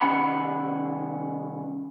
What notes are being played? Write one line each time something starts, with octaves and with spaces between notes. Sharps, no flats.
C2 D#3 C#4 F#5 B5